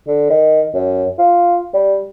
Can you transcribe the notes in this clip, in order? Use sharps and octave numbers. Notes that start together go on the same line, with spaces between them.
D3
D#3
F#2
F4
G3